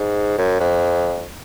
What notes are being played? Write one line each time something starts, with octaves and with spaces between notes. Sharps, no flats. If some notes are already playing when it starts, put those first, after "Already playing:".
Already playing: G#2
F#2
F2